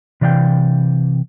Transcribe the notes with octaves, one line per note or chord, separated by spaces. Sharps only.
C3 E3 D5 F5 G5